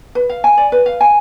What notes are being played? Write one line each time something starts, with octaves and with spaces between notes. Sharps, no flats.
B4
F5
G#5
D5
B4
F5
G#5